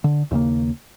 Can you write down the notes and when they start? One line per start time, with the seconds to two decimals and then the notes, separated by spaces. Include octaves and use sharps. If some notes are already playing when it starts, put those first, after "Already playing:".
0.04 D3
0.31 D#2 C#3 A3 A#3